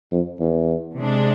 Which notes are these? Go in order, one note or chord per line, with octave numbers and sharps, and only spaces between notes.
F2
E2
C3 G#3 D4